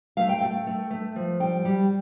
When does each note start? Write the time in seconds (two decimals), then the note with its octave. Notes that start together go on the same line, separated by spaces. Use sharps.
0.17 A3 F5
0.29 G5
0.41 A3 G5
0.67 A3
0.90 A3
1.16 F3
1.40 G3 G5
1.65 G3